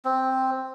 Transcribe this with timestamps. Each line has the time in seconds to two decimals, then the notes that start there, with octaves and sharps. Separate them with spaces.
0.05 C4